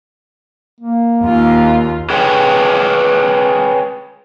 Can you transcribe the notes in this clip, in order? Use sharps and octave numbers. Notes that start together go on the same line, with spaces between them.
A#3
D#2 F4
G#4 B4 C#5 G5